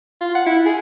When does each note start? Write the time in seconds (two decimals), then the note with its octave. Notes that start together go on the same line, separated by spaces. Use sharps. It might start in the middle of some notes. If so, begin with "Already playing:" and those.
0.21 F4
0.35 F#5
0.46 E4
0.66 G#4